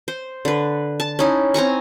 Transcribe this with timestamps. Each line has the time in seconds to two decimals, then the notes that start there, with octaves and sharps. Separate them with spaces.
0.08 C5
0.45 D3 B4
1.00 A5
1.19 C#4 D#4 E4
1.54 C4 G#5 A#5 C#6